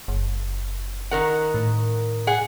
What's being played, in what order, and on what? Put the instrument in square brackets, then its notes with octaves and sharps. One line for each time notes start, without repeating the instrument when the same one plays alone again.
[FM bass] F#1
[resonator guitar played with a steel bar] D#3 A#4 F#5
[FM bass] A2
[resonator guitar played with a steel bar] G#4 F#5